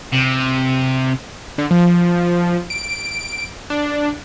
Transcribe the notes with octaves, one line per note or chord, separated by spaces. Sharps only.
C3
D3
F3
D7
D4